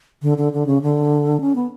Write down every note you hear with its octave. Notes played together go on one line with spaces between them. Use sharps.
D3
D3
D3
C#3
D3
C#4
B3